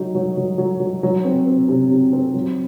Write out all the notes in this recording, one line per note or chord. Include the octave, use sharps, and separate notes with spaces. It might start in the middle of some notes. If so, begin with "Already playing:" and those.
Already playing: F#3 D#4
F#3
F#3
F#3
F#3
F#3
C4
C4
C3
C3
C4
F#3